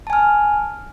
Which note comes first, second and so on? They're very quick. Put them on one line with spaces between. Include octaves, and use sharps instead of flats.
A5 G#5 F6